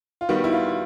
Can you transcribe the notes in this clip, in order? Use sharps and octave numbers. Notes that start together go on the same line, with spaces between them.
F4
D#3 G3 B3 F#4
E4
F4